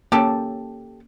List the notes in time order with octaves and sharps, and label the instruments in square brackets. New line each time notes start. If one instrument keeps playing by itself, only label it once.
[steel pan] A#3 C#4 G5 [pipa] G4 A4